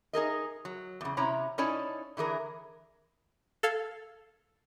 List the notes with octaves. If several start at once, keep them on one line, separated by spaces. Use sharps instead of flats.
D#4 G#4 A#4 D#5
F#3
E2 C#3
C3 C#4 E4 C#5 A#5
C#4 D#4 E4 C#5 D5 A5
D3 E3 G#4 A#4
A4 F5 G#6